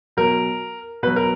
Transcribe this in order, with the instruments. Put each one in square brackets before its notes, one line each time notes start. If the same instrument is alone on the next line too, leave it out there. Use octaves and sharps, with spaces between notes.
[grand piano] B2 F#3 A#4
B2 F#3 B4
A#4